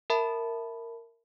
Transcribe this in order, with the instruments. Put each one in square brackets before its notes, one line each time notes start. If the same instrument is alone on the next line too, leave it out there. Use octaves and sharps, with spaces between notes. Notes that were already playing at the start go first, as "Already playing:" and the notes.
[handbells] A#4 E5 A5 B5